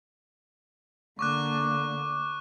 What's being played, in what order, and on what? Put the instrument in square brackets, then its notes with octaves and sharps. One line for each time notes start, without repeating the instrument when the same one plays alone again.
[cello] D3 A#3 [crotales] C#6 D6 F#6